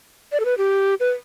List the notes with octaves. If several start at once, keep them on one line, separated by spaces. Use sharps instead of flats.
D5
A4
B4
G4
B4